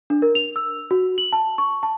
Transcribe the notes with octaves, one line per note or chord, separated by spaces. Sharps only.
D4
A#4
F7
E6
F#4
F#7
A5
C#6
A5